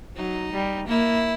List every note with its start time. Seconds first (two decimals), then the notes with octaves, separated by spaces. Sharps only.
0.16 F#3 D#4
0.52 G3
0.87 A#3 E4